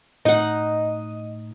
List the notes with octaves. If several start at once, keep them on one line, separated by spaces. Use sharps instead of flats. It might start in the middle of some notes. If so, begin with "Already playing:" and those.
A2 D#4 D#5 F#5